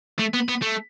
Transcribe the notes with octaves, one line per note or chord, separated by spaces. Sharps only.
A3
B3
B3
A3